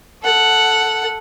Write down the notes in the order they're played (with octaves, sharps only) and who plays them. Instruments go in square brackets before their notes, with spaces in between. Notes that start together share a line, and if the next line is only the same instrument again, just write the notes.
[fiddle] A4 F#5